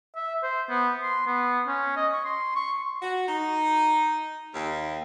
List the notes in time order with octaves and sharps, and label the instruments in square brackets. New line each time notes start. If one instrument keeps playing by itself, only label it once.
[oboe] E5
C5
B3
C6
B3
C#4
D#5
C#6
C6
C#6
[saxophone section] F#4
D#4
D#2